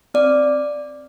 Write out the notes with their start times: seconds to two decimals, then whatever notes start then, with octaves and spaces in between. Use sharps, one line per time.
0.14 C4 D5